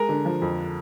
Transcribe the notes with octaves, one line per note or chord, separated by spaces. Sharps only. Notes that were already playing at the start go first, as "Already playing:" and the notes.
Already playing: G#3 A#4
D3
F3
F2